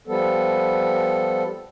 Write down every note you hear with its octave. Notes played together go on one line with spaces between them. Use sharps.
F3 G3 B3 A4